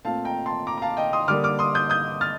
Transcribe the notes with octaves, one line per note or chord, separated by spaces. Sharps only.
A#2 A3 C4 F5 A5
G5 A#5
A5 C6
A#5 D6
A#5
F5 A5
D#5 G5
C6 D#6
D3 G3 A#3 D6 F6
D6 F6
C6 D#6
D#6 G6
D#6 G6
F6 A6